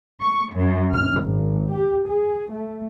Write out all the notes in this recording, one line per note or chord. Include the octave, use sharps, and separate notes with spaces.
C#6
F#2
F6
G#1
G4
G#4
A3